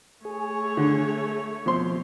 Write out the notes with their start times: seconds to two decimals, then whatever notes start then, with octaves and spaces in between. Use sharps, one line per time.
0.25 A3 G#4 C#5
0.77 D3
1.66 B2 F3 C4 C6